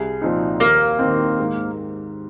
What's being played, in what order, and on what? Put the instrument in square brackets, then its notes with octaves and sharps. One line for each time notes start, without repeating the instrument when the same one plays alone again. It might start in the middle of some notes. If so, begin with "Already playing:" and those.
Already playing: [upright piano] C2 [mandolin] G#4
[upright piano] A#2 F3 C4 D#4
[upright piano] D#2 [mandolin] A#3
[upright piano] D#3 C4
G#2